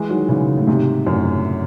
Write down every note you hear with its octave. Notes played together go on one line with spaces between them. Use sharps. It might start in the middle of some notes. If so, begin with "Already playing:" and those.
Already playing: E3 G#3
D#3 F#3
C#3 E3
A2
G#2 C3
F#2 A2